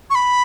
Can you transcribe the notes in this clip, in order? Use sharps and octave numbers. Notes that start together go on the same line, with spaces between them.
C#6
B5